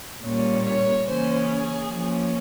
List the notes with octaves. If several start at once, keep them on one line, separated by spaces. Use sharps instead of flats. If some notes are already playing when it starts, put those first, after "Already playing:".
A#2 G3 A#3 C#4
C#5
C#3 E3 A#3 C#4 C5
G#4
F3 A#3 C#4